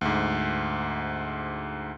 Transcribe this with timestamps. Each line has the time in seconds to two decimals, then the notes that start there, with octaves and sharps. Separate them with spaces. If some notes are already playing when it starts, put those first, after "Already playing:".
0.01 D2 G#2